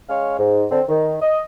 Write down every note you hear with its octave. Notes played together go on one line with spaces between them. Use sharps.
G#3 C#4 C#5 F5
G#2
D3 C4
D#3
D#5